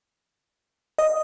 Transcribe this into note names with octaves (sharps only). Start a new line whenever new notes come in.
D#5